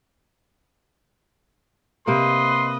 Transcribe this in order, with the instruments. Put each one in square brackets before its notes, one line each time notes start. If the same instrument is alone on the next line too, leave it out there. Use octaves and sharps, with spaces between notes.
[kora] C3 A#3 [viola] B4 D#5 [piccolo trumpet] C6